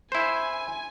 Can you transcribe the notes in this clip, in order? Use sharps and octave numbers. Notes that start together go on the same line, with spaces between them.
E4 C5 G#5